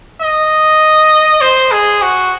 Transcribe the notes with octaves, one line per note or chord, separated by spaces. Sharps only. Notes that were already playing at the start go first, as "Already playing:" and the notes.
D#5
C5
G#4
F#4